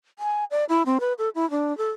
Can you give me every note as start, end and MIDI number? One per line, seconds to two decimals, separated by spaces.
0.19 0.44 80
0.51 0.64 74
0.69 0.83 64
0.86 0.98 60
1.00 1.13 71
1.18 1.29 69
1.35 1.49 64
1.51 1.76 62
1.78 1.91 69